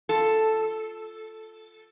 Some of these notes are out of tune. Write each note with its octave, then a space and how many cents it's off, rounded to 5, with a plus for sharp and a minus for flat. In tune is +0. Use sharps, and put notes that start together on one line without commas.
F4 +0 A4 +0